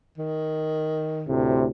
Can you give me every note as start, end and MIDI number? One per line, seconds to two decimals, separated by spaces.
0.18 1.26 51
1.28 1.66 38
1.28 1.66 45
1.28 1.66 48